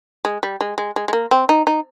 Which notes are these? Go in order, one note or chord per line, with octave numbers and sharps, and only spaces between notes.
G#3
G3
G#3
G#3
G#3
G#3
A#3
C4
D#4
D#4